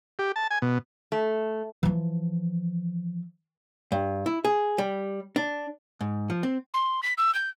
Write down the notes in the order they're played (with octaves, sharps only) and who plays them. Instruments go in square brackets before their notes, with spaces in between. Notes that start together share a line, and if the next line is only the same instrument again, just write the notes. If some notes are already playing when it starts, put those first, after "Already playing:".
[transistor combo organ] G4
A5
G#5
B2
[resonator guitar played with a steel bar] A3
[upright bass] E3 F3
[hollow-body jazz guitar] G2
E4
G#4
G3
D4
G#2
F3
C4
[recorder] C6
B6
E6
G6